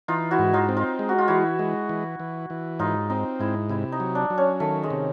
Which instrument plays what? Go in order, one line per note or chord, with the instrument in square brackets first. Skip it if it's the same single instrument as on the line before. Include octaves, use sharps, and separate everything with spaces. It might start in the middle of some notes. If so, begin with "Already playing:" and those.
[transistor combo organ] E3 [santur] D#4 F4
[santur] E4 F#4
[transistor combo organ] G#2
[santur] D#4 F4
[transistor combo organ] C4
[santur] D#4 F4
[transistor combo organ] G#3
[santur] F#4
F4
[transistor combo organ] E3 [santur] E4 F#4
[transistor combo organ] G#3
E3
E3
E3
[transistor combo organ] G#2 [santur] D#4 F4
[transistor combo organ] C4 [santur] D#4
[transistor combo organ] G#2 [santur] E4
[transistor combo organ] C3 [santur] E4
[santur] D#4
[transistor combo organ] F#3
[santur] D4
[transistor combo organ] F#3
[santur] C#4
[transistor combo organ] D#3 [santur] A3
[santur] G#3
[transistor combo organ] C3